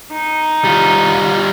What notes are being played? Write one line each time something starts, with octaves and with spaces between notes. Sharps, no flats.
D#4
G3 F4